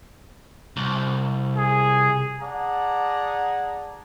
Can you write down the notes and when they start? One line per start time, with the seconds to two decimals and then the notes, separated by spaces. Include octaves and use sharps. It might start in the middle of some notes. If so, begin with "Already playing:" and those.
0.77 C2
1.56 G#4
2.42 G#4 D5 F#5 A5 A#5